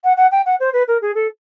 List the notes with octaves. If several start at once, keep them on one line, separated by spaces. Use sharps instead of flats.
F#5
F#5
G5
F#5
C5
B4
A#4
G#4
A4